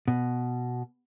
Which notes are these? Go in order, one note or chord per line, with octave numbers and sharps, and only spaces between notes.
B2